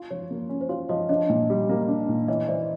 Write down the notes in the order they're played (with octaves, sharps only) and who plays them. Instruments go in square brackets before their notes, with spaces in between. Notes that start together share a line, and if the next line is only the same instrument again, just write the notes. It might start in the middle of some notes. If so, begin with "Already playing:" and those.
Already playing: [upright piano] F4
[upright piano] F3 [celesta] C#5
[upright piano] A#3
C#4
[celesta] C5
[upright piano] F4 [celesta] C#5
[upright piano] F3 [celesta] C#5 D#5
[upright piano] D4 [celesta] C#5 D#5
[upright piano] A#2
G3
A#3
D4
A#2
[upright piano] E3 [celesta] C#5 D#5
[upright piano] E3 [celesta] C5 D5